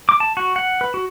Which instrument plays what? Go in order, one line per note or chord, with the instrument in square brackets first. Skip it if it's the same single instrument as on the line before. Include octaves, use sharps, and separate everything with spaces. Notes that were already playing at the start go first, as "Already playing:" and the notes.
[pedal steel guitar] D6
A5
F#4
F#5
B4
F#4